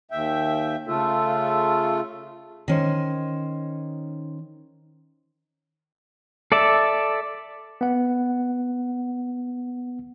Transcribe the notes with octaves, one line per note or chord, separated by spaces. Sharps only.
D#2 E5 G5
C#3 A3 F4 A4
D#3 C#4 C5
A4 D5 E5 A5
B3 F#5